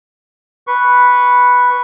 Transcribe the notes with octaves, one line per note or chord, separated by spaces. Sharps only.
B4 C#6